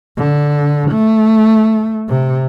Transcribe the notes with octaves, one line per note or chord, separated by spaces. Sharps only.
D3
A3
C3